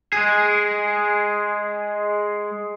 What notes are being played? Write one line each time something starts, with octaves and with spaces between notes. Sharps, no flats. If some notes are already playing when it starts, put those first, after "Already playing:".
G#3 G#4